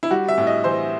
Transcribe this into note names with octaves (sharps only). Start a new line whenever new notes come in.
E4
G3 F#4
E5
A2
D#5
E3 C5